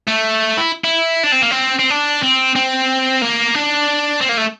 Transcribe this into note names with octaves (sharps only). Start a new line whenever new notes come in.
A3
E4
E4
D4
C4
A#3
C4
C4
D4
C4
C4
A#3
D4
C4
A#3
A3